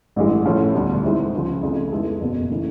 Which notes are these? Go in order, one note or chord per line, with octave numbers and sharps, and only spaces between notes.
A1 G2 E3 G#3
A2 F3 A3 C#4
E1 D2 D3 G3
D#3 G#3 C4 E4
C#2 C#3 F3
F2 C#3 F3 A3
D#3 G#3 B3 E4 A4
F#1 E2 B2
C#3 E3 A3